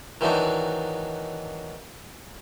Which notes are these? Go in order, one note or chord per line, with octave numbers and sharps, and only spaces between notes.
D#3 E3 F#3 D4 D#4